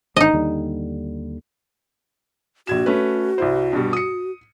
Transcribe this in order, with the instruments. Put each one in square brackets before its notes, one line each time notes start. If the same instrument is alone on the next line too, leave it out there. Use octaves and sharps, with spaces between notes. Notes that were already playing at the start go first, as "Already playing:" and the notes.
[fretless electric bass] G#1 D3 [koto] D#4 D#5
[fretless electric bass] D#2 D3 G3
[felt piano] A#1 G#6 E7 [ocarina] F#4
[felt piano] A3 C#4 B4
C2 E4 C5
G2 B2 G3
D#6 C#7